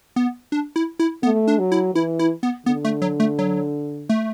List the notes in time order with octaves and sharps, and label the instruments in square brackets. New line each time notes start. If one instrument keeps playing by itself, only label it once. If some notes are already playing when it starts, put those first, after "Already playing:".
[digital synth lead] B3
D4
E4
E4
[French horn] A3 [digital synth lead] B3
[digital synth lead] D4
[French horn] F#3
[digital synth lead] E4
[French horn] E3 [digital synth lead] E4
[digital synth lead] E4
B3
[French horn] D3 [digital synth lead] B3
[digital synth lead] A3
F#3
A3
F#3
A3